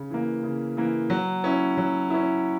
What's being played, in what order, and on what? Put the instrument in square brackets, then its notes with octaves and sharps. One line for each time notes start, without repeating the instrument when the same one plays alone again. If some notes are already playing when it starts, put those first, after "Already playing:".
Already playing: [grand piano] C#3
E3 A#3
C#3
E3 A#3
F#3
C#4 E4
F#3
C#4 E4